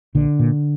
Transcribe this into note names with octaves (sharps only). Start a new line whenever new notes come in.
A#1 D3
A#2